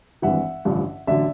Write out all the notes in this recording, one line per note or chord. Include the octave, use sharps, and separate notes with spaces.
G#1 G2 E3 E5 F#5
A1 G2 D3 F3
A1 D3 F#3 D5 E5